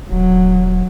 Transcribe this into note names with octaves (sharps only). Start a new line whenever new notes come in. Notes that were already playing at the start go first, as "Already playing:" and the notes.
D#1 F#3